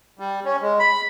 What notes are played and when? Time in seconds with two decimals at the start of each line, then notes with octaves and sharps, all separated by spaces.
0.19 G3
0.45 C#4
0.62 G#3
0.79 B5